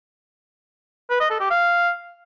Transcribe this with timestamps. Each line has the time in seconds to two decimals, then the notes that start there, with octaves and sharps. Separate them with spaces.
1.10 B4
1.20 D#5
1.30 A4
1.40 G4
1.50 F5